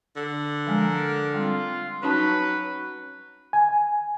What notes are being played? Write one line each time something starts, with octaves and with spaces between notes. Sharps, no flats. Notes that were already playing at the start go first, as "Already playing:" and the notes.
D3
F3 G#3 A#4
G3 C4 F4
F#3 C#4 D#4 B4 A5
G#5